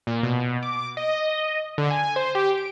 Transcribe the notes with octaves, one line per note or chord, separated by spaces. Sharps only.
A#2
B2
D6
D#5
D3
G#5
C5
G4
D7